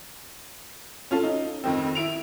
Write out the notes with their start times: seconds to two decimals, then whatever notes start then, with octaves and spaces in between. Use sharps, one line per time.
1.11 C#4 F4 A4
1.23 D#4
1.64 F2 D#3 C4
1.95 E4 D7 F7